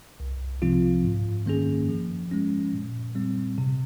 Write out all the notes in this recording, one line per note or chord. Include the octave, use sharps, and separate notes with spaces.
C2
C3 F3 C4 F4
G#2
D#3 A#3 C#4 G#4
F3
G#3 C#4
A#2
G3 C4
C3